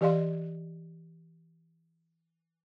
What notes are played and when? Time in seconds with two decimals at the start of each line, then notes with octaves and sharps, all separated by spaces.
0.01 E3 G4 D5 D#5 F5 C6